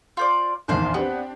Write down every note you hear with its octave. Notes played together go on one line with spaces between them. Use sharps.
F4 C5 D5
A#1 E2 D#3 D4 C5 F5
B3 C4 D4 G4